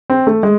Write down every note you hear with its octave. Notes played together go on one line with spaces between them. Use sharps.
C4
A3
G#3